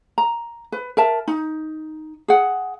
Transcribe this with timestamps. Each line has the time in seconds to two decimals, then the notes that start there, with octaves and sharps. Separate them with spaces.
0.18 A#5
0.72 B4
0.97 A#4 E5 A5
1.28 D#4
2.28 G#4 F#5